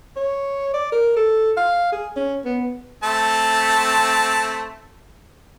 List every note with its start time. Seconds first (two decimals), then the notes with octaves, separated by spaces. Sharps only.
0.16 C#5
0.73 D5
0.92 A#4
1.16 A4
1.57 F5
1.92 G#4
2.16 C#4
2.45 B3
3.04 A3 C4 A5